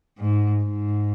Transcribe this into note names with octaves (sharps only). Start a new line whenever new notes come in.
G#2
G#2